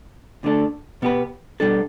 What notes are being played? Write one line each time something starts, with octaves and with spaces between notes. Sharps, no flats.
D2 D3 A3 D4 A4
B2 B3 G4 B4
B2 G3 D4 A4